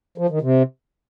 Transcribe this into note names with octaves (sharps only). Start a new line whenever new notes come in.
F3
D#3
C3